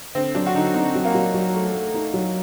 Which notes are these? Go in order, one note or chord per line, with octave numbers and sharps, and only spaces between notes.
D3 C4
F#3 D4
F#4
D3 D#4
C4 D#4
F#3
A#3
F#3
F#3
A3
A3
D#4
F#3